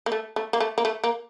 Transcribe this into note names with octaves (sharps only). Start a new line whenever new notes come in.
A#3
A3
A3
A#3
A3
A#3
A3
A#3